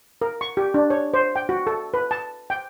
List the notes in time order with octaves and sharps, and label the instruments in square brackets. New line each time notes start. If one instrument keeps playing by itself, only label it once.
[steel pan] A#4
C#6
G4
D4
C#5
C5
G5
F#4
A4
B4
A5
G5